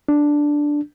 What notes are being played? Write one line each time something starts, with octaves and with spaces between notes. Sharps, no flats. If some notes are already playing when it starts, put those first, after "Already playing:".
D4